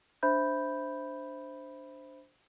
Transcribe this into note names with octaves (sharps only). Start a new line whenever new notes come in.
D4 C5 E5 B5 G6